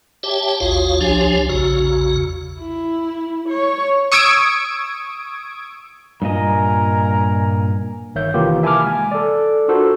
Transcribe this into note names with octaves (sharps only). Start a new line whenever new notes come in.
G4 C#5 E5 G5 A5
A1 D#2 F4 F#4 C#5 F5
C2 F3 D4 G4 C#5 G#5
A#1 E2 C#3 F#4
E4
C#5
C#6 D#6 E6 G#6 D7
G2 A#2 A#4 D#5 G#5 A#5
G1 D#3 C#5 E5 G6
C3 D#3 E3 A#3 F4 G4
E5 G#5 A5 B5 D6 F6
G#3 G#5
A4 D5
D4 F4 F#4 A4 A#4 C5